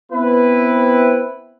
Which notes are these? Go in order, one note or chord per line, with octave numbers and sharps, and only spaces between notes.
B3 C4 E4 B4